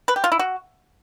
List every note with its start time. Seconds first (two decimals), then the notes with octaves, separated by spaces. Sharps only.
0.08 B4
0.16 G4
0.24 F4
0.32 E4
0.39 F#4